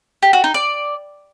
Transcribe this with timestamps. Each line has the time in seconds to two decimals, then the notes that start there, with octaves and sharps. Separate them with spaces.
0.23 G4
0.33 F#4
0.44 D#4
0.54 D5